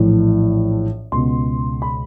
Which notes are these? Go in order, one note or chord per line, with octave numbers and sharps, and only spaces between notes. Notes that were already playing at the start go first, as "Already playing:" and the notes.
Already playing: A#1 A2 E3
C#2 B2 C6
B5